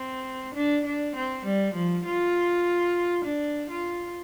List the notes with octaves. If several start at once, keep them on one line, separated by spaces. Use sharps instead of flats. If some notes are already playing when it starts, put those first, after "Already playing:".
Already playing: C4
D4
D4
C4
G3
F3
F4
D4
F4